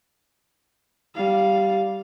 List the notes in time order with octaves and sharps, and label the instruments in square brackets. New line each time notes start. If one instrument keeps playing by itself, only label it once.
[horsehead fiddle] G3 F5